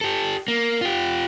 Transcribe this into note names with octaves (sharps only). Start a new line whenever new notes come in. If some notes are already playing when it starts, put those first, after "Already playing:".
G4 A4
A#3
F4 G4